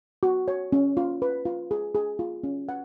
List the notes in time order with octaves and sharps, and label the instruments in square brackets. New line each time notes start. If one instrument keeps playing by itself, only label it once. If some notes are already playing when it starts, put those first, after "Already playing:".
[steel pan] F#4
C#5
C#4
F4
B4
F4
G#4
G#4
F4
C#4
F#5